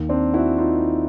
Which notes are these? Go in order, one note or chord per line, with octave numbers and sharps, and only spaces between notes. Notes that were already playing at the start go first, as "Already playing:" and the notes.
Already playing: D#2 D#3
C4 D4
E4 F#4
D#4 F4